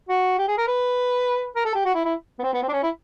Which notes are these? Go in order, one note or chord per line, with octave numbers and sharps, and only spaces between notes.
F#4
G4
G#4
A#4
B4
A#4
A4
G4
F#4
E4
E4
B3
C4
B3
C4
D4
C#4
E4